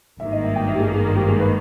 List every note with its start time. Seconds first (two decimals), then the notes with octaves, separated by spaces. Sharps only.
0.20 G#1 G2 D#3 A#3 E5
0.32 D#5
0.44 E5
0.56 G5
0.68 E5
0.75 G4
0.80 G#4
0.93 G#4
1.04 A#4
1.16 G4
1.28 G#4
1.40 B4